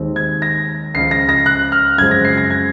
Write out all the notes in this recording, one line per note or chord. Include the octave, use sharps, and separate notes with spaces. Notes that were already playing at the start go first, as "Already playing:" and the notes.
Already playing: D#2 D#3 G#3 C4
G#6
A#6
C#2 C#3 F3 C7
A#6
A#6
F#6
F6
F#2 C#3 F3 G#3 C4 G#6
A#6
C7
A#6
G#6